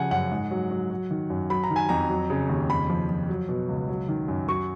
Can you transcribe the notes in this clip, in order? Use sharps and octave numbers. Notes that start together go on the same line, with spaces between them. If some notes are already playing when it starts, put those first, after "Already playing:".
Already playing: C#3 F3 F#5 G#5
F#2 F#5
G#2
F#3
F#3
F#3
D#3
F#2
F#3 B5
A#5
D#3
G#5
F2 A#5
F#3
C#3
D#2
F2 B5
F3
F3
F#3
B2
C#2
F#3
D#3
F#2
F#3 C#6